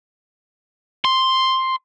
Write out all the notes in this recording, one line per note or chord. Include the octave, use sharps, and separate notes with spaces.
C6